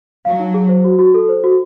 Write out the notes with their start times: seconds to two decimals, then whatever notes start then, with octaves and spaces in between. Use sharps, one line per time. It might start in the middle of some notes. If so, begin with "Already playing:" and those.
0.25 F#3 F5
0.39 D#4
0.54 G#4
0.69 C5
0.84 F#4
0.99 F#4
1.14 A4
1.29 C5
1.44 F#4